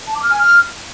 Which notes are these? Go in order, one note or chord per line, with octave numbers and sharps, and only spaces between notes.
A5
D6
F6
G#5
F6